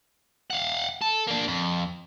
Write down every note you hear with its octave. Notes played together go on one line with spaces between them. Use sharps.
F5 F#5
A4
A#3 D4
F2